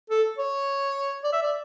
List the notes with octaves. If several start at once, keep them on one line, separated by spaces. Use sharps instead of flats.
A4
C#5
D5
E5
D5